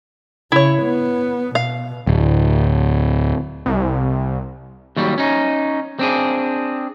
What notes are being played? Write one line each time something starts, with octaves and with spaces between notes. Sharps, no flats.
C#3 E4 C#5
B3
B2 F5
D1
C2
D#2 F#3 G3
C#4 D#4
C4 D4 G#4